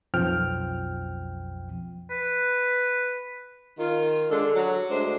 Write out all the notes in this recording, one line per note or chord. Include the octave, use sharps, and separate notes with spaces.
B1 F2 F3 G5 F6
B4
D#3 F4
D3 G#3 D4 A4
F#3
D2 G#3 D4 C5